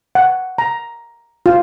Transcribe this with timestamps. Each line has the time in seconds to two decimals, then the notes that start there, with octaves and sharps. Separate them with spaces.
0.15 F#5
0.58 A#5
1.46 F4